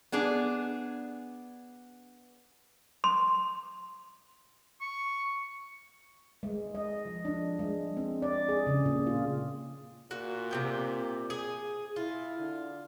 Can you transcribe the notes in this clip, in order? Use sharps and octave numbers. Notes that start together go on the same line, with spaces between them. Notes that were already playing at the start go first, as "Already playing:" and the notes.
B3 D4 G#4
C6
C#6
G#3
D#5
F3
D4
G#3
C4
D5
G#4
C#3
A#2
F4
A#2 F#4
C3 B3 G5
G#4
E4 F4
D3